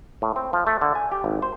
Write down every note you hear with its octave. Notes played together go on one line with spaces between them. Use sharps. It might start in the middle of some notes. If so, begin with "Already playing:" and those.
A2
C4
F3
A3
D3
G#5
G4
G#1
C5